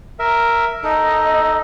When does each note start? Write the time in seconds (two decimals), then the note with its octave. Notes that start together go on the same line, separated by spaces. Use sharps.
0.19 A#4 E5
0.83 D#4 A4 D#5